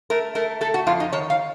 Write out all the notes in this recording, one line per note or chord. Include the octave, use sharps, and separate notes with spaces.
A3 A#4
A3 A#4
A3 A4
F#4
F2 F4
D#4
D#3 C#5
F5